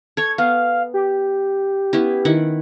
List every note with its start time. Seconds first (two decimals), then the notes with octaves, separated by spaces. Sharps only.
0.17 A4 C#5 G#6
0.38 B3 F5
0.94 G4
1.93 B3 C#4 E4
2.25 D#3 E4 F#5